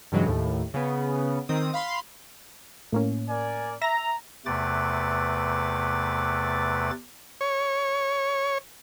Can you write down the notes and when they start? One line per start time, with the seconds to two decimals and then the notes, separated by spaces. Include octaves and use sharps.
0.12 G2 C#3 E3 F#3 G#3
0.26 D#2 A2
0.74 C#3 B3
1.49 D#3 C4 D#6
1.74 F5 B5 C6
2.92 A2 A#3 C#4
3.29 A#4 D5 G#5
3.82 E5 A#5 A#6
4.46 E2 C3 A3 B4 D6 A6
7.41 C#5